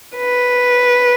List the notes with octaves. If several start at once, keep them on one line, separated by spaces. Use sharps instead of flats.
B4